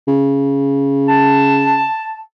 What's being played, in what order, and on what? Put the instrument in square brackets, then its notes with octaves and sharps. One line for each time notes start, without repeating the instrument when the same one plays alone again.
[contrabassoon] C#3
[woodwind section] A5